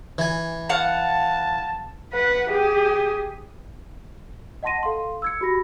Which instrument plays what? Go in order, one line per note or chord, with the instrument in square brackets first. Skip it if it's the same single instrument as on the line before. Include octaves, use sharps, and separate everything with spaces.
[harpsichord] E3 G#5
[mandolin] F5 F#5 [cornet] A5
[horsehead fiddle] B4 F#5
G4 G#4
[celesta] D#5 F#5 A5 C6 A#6 D#7
A4 F5 C6
E6 G#6 C#7
F#4 G4 B5 A#6